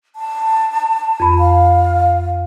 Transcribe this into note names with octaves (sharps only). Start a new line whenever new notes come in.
A5
F2 B5
F5